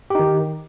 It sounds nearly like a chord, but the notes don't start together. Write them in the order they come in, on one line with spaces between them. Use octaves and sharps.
G4 D#4 D#3